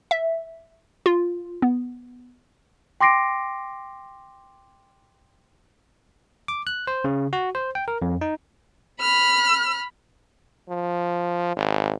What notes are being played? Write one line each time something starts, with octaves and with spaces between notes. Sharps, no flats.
E5
F4
B3
G5 C6 D6 A#6 C7 D7
D6
F#6
C5
C#3
F#4
C5
G5
A#4
F2
D#4
B5 F6
F3
G#1